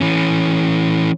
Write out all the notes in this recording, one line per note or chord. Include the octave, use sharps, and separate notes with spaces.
E3 C#4